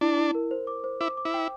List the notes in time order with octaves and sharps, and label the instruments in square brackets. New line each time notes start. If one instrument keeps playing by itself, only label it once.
[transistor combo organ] D4 [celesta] E4
[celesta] E4
A#4
C5
D6
C5
[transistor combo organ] E4 [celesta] D6
[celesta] D6
[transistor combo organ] E4
[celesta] G5